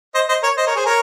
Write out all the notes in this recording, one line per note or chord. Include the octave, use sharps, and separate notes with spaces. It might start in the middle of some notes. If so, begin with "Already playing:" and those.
C5 D#5
C5 D#5
A#4 C#5
C5 D#5
A#4 C#5
G#4 C5
A#4 C#5